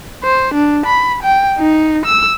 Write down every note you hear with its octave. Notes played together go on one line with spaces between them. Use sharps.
C5
D4
B5
G5
D#4
E6